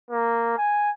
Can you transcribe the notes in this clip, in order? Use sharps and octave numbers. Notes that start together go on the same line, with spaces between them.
A#3
G#5